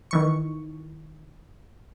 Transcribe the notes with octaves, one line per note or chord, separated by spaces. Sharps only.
D#3 E3 C#6